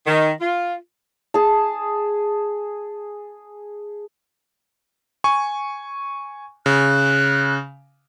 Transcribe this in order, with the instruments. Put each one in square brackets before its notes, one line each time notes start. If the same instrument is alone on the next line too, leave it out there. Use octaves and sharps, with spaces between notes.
[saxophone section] D#3
F4
[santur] G#4 A5
[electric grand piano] G#5 C#6
[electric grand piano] C#3 [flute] F#6